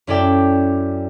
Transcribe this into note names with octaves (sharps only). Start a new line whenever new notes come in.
F#2 C#4 E4 A4 D5 G5